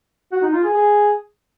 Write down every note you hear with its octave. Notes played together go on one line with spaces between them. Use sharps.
F#4
D#4
F4
G#4
G#4